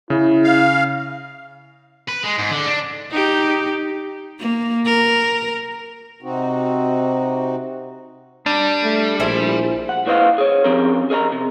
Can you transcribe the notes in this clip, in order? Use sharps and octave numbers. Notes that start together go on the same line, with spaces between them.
C#3 E4
F5
B4
G#3
G#2
D3
D4
D#4 G4
A#3
A#4
C3 C4 D#4 F#4
G3 D4
A3
A#1 E4 G#4 C5
F#5
A#2 E4 B4 C5 D#5 F5
G#4 C#5
F3 C4 C#4 G4 A#4
G#4 A#4 D#5 G#5 A#5
C3